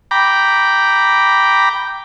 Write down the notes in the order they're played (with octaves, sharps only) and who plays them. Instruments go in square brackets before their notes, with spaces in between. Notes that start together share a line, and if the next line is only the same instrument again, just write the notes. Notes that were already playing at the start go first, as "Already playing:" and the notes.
[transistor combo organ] G5 A#5 B5 D6